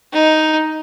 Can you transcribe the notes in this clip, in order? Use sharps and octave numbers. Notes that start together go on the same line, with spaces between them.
D#4